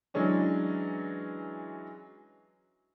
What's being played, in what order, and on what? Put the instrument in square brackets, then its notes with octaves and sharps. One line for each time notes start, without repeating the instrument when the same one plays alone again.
[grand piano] E3 F#3 G#3 C#4 D4